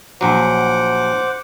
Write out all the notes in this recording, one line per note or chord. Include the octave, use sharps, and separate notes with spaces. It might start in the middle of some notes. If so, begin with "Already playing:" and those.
A#1 F#3 C5 F#5 D6